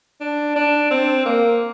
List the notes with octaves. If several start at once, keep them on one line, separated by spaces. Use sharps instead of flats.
D4
D4
C4
A#3